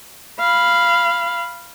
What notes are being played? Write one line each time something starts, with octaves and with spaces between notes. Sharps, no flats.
F5 B5